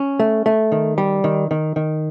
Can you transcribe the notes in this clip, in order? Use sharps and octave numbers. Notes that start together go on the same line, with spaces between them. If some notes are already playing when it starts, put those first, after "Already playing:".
Already playing: C#4
A3
A3
D#3
G3
D#3
D#3
D#3